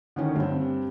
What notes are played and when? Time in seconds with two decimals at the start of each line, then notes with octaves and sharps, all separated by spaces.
0.16 D3 D#3 C#4
0.36 G2 C4